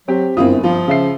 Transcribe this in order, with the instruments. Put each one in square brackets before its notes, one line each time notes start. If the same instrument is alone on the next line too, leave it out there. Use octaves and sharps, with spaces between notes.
[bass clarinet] F#3 [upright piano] C4 G4
[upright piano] G1 D#6 [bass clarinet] F#2 [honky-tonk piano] C4 E4 F4
[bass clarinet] F3 [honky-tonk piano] F4
[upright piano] C#3 E5 C7